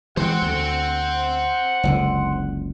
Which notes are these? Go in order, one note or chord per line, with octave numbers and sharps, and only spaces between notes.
E3 G#3 C5 F#5 G5
D2
F#1 C#2 D3